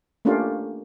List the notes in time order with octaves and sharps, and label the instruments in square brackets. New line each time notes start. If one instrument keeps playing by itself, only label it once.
[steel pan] A3 A#3 C#4 D4 F4 G4